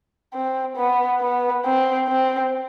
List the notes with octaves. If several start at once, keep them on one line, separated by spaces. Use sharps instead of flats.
C4
B3
B3
C4
C4